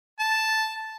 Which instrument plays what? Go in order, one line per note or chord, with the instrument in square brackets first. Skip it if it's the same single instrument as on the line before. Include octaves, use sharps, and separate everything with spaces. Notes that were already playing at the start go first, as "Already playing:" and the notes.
[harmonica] A5